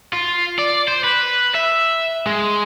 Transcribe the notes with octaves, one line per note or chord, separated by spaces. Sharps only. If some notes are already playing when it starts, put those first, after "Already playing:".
F4
D5
C5
B4
E5
G#3